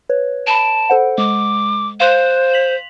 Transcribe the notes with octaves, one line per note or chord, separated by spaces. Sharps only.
B4 C#5
A5 B5 D7
A4 C5 F#5
G#3 D6
C5 F5 C6 F#6
B6 F7 F#7